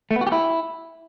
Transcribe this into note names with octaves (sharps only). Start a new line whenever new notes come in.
A3
B3
F#4
G4
E4